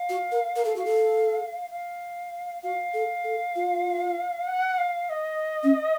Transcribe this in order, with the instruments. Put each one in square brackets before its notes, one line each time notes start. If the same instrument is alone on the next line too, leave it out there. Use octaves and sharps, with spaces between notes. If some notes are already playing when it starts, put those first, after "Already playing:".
Already playing: [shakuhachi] F5
[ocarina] F#4
A#4
A#4
A4
[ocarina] F#4 [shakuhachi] F5
[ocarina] A4
[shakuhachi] F5
[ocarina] F#4 [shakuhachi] F5
[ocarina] A4
A4
F4
[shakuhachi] F#5
F5
D#5
[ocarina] C#4